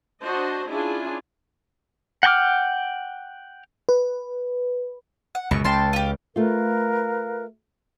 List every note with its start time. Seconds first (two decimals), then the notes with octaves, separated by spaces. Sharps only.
0.22 D4 F#4 C5 D#5 A5
0.69 C#4 D4 E4 F4 G#4 G#5
2.23 F#5 G5 A5 D6 F6
3.89 B4
5.35 F#5
5.51 C#2 F#2 B2 C#6
5.64 C#2 G5 A5 C6
5.93 F4 G4
6.36 A3 F4 A#4 B4 F5